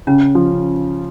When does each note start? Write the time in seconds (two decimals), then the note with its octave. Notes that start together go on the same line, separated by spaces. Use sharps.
0.07 C#3 C#4
0.35 F3